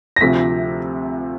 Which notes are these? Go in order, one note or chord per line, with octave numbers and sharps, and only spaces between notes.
A#6
D2 C3 F3 A3 B6